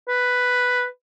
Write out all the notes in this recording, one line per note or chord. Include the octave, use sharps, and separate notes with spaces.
B4